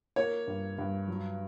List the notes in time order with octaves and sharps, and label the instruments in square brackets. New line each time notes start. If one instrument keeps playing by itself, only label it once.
[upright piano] A#3 C#5
G2
G2
F#3